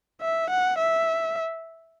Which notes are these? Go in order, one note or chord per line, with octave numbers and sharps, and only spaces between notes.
E5
F#5
E5